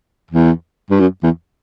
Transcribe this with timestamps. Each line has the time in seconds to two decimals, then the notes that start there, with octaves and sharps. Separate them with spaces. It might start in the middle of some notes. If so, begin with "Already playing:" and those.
0.31 E2
0.90 G2
1.00 F#2
1.23 E2